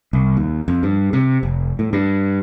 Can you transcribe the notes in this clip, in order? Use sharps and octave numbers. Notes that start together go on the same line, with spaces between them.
C2
D#2
F2
G2
C3
F1
A2
G2